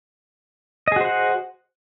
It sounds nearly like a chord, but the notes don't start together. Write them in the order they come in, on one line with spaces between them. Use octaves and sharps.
D#5 G#4 F#4 C5 F#5